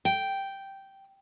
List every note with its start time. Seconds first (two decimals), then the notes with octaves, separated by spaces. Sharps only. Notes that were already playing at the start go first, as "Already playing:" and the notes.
0.05 G5